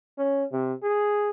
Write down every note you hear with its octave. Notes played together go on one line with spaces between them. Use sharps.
C#4
C3
G#4